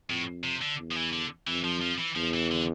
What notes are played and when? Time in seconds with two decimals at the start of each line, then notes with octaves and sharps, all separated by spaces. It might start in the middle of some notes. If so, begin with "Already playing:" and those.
0.09 F2 A2
0.44 C3
0.62 D3
0.78 E2
0.91 F3
0.96 E3
1.13 D3
1.47 F2 E3
1.65 F3
1.82 F3
1.99 E3
2.16 E2 F3
2.34 E3
2.51 D3